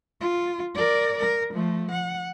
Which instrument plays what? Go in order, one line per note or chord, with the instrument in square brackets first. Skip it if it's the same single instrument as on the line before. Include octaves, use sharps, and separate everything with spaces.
[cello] F4
A#4 D5
A#4
F3 A3
F#5